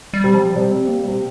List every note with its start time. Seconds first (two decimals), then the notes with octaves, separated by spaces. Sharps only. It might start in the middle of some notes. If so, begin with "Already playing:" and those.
0.13 G3
0.24 C3
0.34 F3
0.55 C3 G3
0.72 C4
0.87 A#3
1.04 C3 G3